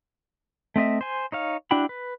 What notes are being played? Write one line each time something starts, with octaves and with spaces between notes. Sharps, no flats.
A3 C4 D#5 E5
C5 G#5
D#4 C#5 F5
D4 E4 F#4 G5 B5
B4